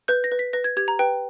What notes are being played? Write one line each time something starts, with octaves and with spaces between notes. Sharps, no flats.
B4 G6
A#6
B4
B6
B4 A#6
G#6
G4 G#6
A#5
B4 G5